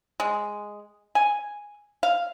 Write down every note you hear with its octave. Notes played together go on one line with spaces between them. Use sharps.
G#3
G#5
F5